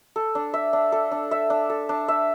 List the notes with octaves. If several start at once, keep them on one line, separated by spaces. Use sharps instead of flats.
A4
D4
E5
D4
A4
D4
E5
D4
A4
D4
E5